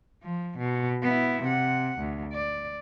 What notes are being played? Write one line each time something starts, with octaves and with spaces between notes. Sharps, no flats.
F3
B2
B3 E4
C3 F#5
D2
D5